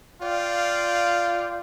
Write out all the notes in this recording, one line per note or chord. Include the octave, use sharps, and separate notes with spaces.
F4 D5 F5 G5